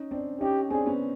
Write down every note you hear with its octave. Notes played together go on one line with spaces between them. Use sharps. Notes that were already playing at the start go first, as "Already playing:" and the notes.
Already playing: C#4 D#4
C4 D4
C#4 D#4 G4
C4 D4 G#4
B3 C#4